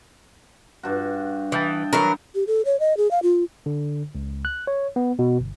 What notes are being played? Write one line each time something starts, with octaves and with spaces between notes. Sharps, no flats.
G2 F#4
E3 D#5 G5 A5
E3 F#3 A#4
G4
A4
C#5
D#5
G#4
F5
F4
D3
C#2
F#6
C#5
B3
B2
G1